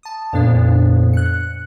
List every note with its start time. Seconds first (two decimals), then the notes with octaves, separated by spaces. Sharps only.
0.03 A5 D#6
0.33 F2 A#2 B3 D4
1.13 F#6 C#7